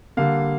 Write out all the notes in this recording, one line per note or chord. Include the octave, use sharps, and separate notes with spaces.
D3 G3 A#3 F5